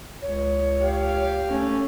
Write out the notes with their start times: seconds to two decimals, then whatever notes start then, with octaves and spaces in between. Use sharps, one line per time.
0.22 C#2 C#5
0.81 G4 F5
1.49 A3 C#4